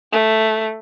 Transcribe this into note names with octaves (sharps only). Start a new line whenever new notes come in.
A3